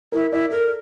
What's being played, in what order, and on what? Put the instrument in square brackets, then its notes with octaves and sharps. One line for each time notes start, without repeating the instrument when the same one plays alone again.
[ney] E4 [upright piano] A#4
[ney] E4 [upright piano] D5
[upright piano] A4 [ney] A#4